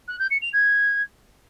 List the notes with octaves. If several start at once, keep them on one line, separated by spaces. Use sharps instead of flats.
F#6
G6
C#7
F7
G#6